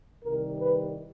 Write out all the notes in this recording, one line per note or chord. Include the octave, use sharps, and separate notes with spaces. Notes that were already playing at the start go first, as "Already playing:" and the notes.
C2 C3 D#3 G3 A#4
B4